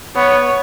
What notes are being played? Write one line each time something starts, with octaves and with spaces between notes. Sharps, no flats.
B3 C#5